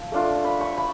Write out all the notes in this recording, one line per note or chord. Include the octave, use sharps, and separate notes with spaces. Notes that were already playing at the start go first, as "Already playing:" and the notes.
Already playing: F3
A3 D4 F4
B5
C#6
B5